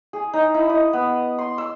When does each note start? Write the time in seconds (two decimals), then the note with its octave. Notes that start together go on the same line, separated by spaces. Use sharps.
0.13 G#4
0.34 D#4
0.54 E4
0.70 D#5
0.93 B3
1.38 C6
1.58 E6